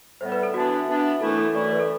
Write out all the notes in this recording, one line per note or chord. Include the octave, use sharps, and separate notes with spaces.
A2 G3 B3 C5
B4
A4
E3 B3 D4 F#4
E3 B3 D4
F#2 E3 A3 E4 A4
A4
F#2 E3 A3 E4 D5
B4
A4